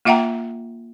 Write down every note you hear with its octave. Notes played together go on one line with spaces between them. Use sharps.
A#3 F4 E5 F#5 G5 A#5